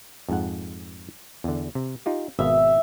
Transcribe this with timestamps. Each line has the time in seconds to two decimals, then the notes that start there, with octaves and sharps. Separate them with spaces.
0.29 F2 G#2 F#5
1.44 E2 D3
1.75 C3
2.06 D#4 F4 G4
2.39 G#1 B2 E5 F5